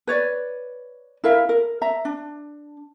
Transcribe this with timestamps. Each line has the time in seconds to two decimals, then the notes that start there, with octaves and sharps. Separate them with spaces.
0.07 B4 C#5 D5
1.24 E4 A#4 E5 F5
1.49 A#4
1.82 E5 A#5
2.05 D4